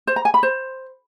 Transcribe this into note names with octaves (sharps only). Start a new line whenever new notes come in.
C5
A#5
G#5
B5
C5